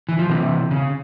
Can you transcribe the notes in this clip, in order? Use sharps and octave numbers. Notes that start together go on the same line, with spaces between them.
E3
F3
C3 E3
C#3